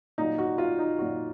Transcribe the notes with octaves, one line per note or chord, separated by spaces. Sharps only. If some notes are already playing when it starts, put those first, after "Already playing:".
A#2 F#3 D#4
F#4
F4
D#4
A#2 F#3 F#4